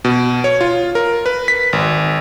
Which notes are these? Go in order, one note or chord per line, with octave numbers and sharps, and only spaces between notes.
B2
C#5
F4
A#4
B4
B6
G#1